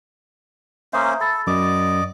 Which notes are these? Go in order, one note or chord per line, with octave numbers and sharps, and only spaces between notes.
A#3 C#4 C5 E5 A#5 D#6
A4 B5 A6
F#2 D5 D#5 D6